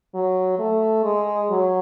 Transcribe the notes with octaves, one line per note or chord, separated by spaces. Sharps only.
F#3
A3
G#3
F#3